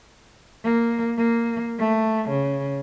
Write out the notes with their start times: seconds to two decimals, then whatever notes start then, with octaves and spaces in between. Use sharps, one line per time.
0.64 A#3
1.18 A#3
1.79 A3
2.29 C#3